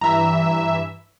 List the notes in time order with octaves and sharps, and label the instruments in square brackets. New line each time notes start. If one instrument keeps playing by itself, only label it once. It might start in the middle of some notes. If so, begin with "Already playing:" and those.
[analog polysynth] G2 E3 E5 [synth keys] A#5